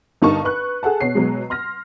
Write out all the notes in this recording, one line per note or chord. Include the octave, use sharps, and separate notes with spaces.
G1 G2 D#4 A#4 A5 C#6
B4 C#6 F#6
G#4 A4 F#5 A5
B2 C#5 C7
B2 F#3 G#3
C6 F6 A#6